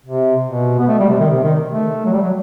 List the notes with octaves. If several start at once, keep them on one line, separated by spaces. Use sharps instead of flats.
C3
B2
B3
A3
G3
C3
D#3
C3
D#3
A3
F#3
G3
F#3